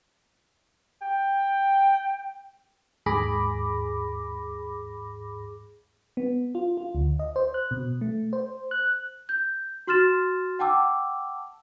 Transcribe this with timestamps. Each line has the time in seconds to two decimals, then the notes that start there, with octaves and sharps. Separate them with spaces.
1.02 G5
3.06 D#2 G#2 G#4 B5 D6 A#6
6.17 B3
6.55 F4
6.77 F4
6.95 D2
7.19 D#5
7.36 C5
7.54 F#6
7.71 B2
8.01 A3
8.33 C5
8.71 F#6
9.29 G6
9.87 F#4 C6 F6 A6 E7
10.59 F#5 G5 A5 D6 E6